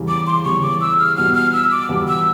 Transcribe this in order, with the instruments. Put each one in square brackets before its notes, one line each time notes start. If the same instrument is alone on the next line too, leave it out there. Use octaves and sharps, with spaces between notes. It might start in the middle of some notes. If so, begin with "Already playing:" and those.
Already playing: [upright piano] E2 C#3 E3 G3
[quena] D6
C6
[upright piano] E2 C#3 E3 G3 [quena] C#6
[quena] D6
E6
F6
[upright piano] E2 B2 G3 B3 [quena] F6
[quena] F6
E6
D6
[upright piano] E2 B2 G3 B3
[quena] E6